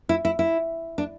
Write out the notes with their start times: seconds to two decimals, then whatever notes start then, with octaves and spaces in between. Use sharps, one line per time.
0.09 E4
0.25 E4
0.39 E4
0.98 D4